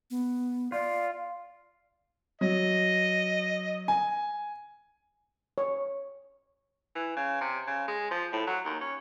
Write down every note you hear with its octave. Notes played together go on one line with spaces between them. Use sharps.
B3
F4 D5
F#3 D#5
G#5
C#5
E3
C#3
C3
C#3
G#3
F3
A2
F#3
D#2
C#4